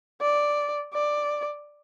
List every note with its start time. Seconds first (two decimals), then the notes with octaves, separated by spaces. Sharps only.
0.22 D5
0.94 D5